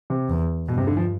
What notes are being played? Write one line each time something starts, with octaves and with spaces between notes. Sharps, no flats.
C3
E2
G2 B2
C3
D3
F3